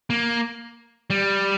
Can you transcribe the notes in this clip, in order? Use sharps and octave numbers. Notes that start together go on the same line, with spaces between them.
A#3
G3